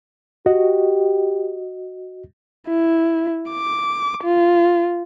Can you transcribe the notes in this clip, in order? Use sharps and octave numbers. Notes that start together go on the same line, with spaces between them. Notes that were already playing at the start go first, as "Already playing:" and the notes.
F#4 G4 D#5
E4
D6
F4